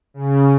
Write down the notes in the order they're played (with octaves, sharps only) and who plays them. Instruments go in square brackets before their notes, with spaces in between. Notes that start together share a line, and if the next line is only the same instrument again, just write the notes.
[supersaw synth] C#3